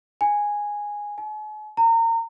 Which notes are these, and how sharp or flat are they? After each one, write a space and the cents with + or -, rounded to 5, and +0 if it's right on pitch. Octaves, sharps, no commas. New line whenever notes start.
G#5 -5
G#5 +45
A#5 -30